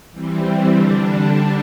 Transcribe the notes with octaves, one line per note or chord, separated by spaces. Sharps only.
E3 G3 C4
D3 G3 D4